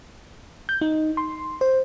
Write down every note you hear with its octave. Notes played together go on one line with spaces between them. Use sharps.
G6
D#4
C6
C5